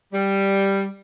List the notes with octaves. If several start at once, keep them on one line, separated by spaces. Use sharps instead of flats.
G3